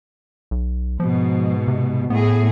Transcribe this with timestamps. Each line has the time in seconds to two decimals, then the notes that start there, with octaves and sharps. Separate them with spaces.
0.51 B1
1.00 G#2 B2 F3
1.68 C3
2.10 A2 B3 G#4